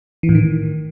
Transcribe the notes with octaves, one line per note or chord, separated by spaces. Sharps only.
E3
A2
D#3